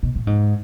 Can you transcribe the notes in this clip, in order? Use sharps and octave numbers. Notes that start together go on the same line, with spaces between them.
B2
A2
G#2